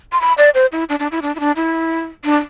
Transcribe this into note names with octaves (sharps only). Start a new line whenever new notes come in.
C6
B5
D5
C5
E4
D4
D4
E4
D4
E4
D4
E4
D4